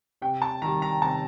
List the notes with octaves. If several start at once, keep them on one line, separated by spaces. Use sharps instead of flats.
C3 G5
A5
D#3 G3 A#5
A#5
C3 A5